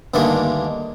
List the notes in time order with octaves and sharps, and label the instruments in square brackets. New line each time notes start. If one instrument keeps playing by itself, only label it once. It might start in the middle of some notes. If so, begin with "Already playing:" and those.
[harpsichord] D2 G2 D3 D#3 G#3 A#3